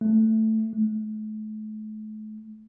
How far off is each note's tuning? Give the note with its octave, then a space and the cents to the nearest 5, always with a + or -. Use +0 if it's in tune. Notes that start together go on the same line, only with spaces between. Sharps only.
A3 +5
A3 -35